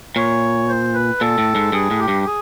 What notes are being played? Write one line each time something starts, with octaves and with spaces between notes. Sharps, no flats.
A#2 C#5
C5
B4
A#2 A4
A2
G#2
G2 G#4
A2
G4
G2
G#4